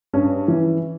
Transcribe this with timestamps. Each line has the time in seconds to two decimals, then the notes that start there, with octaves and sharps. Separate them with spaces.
0.13 G2 C#4
0.48 E3